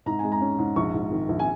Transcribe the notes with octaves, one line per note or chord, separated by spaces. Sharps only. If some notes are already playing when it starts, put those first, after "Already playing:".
G#2 A#5
G#3 G#5
A#5
C#4
G#2
A#1 C#6
G#2
D#3
A#1
G#5